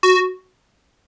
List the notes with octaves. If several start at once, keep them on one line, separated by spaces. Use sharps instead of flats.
F#4